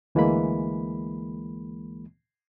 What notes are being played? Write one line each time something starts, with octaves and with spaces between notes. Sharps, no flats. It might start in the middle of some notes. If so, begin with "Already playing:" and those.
D2 E3 G#3 A#3 B5